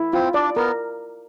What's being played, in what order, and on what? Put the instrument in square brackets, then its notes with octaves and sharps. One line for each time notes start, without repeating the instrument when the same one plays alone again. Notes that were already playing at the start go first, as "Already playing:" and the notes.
Already playing: [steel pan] E4
[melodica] C4 [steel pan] F4
[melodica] D4 [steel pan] D5
[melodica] B3 [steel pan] A#4